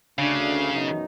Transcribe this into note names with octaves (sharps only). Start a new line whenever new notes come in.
D2 C#3 D4 F5
F#2 B2 D#4